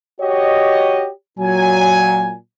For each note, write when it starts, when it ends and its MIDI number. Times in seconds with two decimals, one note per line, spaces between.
0.20 1.09 66
0.20 1.09 67
0.20 1.09 73
0.20 1.09 75
1.39 2.34 46
1.39 2.34 54
1.39 2.34 80